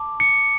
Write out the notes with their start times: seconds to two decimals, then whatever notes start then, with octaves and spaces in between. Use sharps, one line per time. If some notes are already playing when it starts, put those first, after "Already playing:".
Already playing: A5 D6
0.20 C#7